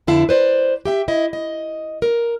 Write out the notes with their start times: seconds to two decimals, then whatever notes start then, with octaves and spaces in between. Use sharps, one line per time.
0.07 F2 D3 E4 F5 A5
0.29 B4 C5 D5
0.85 G4 E5 G5
1.08 E4 D#5
1.33 D#5
2.02 A#4